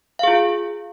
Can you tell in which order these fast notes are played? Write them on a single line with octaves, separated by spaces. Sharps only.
F5 G#4 F4